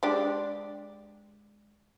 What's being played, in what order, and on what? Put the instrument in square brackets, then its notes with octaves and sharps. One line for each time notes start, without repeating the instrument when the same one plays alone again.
[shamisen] G#3 D4 G4